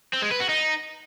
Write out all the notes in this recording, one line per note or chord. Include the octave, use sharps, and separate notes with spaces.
C4
G#3
B4
F#4
D#4